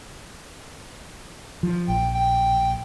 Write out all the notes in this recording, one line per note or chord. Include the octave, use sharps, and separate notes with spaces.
F3
A#1 G5
G5